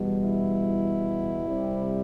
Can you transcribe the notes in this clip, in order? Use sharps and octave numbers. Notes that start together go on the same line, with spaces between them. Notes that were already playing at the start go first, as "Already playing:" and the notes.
Already playing: E2 B2 G3
E4
C2 C3 G3